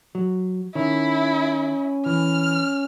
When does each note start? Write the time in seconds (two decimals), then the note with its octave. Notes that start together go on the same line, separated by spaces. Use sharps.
0.15 F#3
0.75 D#3 C#4 E4
2.06 E3 F6